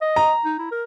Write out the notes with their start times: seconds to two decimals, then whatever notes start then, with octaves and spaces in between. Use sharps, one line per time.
0.01 D#5
0.16 A#5
0.45 D#4
0.59 E4
0.72 A#4